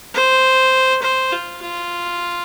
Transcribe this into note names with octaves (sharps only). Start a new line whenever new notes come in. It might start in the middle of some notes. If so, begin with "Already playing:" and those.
C5
C5
F4
F4